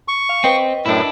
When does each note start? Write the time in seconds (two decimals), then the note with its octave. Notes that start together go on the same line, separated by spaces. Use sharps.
0.08 C#6
0.29 F5
0.44 C4 B4 D#5 G5
0.86 F#2 A2 D4 E4